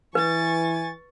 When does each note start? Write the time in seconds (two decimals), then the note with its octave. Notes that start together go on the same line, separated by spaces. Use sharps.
0.15 E3 B4 G#5 C#6 A6